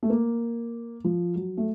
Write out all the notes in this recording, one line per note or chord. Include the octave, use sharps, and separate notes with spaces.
A3
A#3
F3
F#3
A3